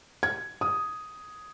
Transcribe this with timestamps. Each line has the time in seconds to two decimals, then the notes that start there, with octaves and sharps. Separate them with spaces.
0.23 G#6
0.61 D#6